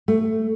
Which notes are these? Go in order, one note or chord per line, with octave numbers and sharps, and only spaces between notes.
A3